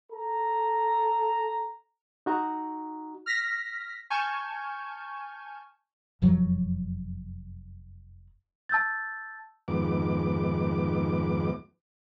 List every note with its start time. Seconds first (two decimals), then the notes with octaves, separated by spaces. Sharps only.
0.12 A4 A#5
2.26 D#4 F#4 A#5
3.26 F6 A#6 B6
4.10 G#5 A5 C#6 F6 G6 G#6
6.22 F1 F#2 F3 F#3
8.69 A5 E6 G6 A6
9.68 F2 G#2 D#3 B3 D6